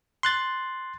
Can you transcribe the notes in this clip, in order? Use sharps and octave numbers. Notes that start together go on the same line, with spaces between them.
C6 F#6 A6